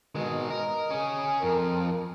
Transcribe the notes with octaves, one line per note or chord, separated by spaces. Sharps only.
B2 D#3 G#3
A#4 D#5
C#4 G#4
F2 A#4